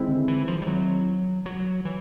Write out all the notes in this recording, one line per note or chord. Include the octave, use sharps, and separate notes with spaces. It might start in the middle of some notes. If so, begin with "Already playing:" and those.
Already playing: D#3 G#3 C4 E4
D3
E3
F3
G3
F#3
F#3
E3